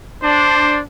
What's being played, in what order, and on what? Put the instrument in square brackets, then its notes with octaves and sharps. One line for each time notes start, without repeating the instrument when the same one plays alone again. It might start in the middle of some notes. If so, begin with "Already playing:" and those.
[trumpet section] D4 [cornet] C5